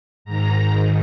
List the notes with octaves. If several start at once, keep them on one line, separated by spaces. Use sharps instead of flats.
G#2 D#3 A#5